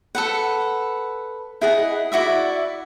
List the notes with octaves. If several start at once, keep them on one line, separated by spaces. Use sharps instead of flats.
A4 B4 F#5
E4 G#4 D#5 F#5
E4 F#4 D5 E5